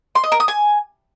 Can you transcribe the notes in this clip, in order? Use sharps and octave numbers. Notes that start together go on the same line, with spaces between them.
C6
D#5
A#4
D#6
G#5